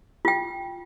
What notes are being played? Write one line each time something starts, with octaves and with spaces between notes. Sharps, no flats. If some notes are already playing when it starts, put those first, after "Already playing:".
F4 G5